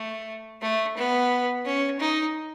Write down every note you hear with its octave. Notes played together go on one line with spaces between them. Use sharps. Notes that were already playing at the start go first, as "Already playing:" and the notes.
Already playing: A3
A3
B3
C#4
D#4